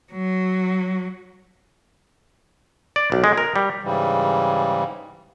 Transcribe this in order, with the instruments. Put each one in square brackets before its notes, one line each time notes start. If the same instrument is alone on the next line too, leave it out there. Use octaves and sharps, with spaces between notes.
[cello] F#3
[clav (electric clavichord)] D5
B1
G#3
A#4
G3
[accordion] G#2 C#3 E3 G3